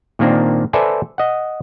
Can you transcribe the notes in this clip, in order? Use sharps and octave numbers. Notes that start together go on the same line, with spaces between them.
A#2 D#3 A#3 C4 D4
A4 B4 C5 D5 E5 G#5
D#5 F#5